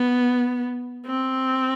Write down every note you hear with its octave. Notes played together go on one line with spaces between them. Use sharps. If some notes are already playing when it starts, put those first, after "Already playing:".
Already playing: B3
C4